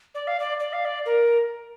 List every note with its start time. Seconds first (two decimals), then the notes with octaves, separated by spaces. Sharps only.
0.15 D5
0.27 F5
0.40 D5
0.60 D5
0.73 F5
0.85 D5
1.06 A#4